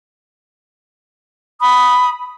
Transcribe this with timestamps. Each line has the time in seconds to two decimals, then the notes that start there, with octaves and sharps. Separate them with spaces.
1.59 B5 D#6